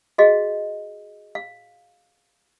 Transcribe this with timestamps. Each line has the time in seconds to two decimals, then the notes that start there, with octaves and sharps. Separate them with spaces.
0.18 F#4 G#4 D#5 F5
1.35 F5